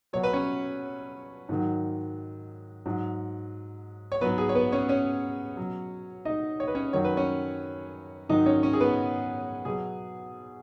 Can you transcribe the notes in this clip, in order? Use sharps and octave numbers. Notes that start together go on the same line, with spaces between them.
B2 F#3 C#5
B4
C#4 C#5
G#2 D#3 F#3
G#2 F#3
C#5
G#2 F#3 B3 B4
G#4
C#5
B3 B4
C#4 C#5
C#4 C#5
B2 F#3
D#4 D#5
C#5
B4
C#4 C#5
F#2 D#3 F#3 C#5
B4
C#4 C#5
G#2 D#3 F#3 D#4 D#5
C#4 C#5
C#4 C#5
G#4
B3 B4
B2 F#3 G#4